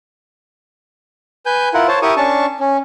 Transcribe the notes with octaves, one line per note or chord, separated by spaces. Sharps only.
B4 G#5 G6
E4 F4 A#4 F#5
C5 C#5 A5
E4 G4 A#4 C#6 D#6
C#4 D4 A5 C#6
C#4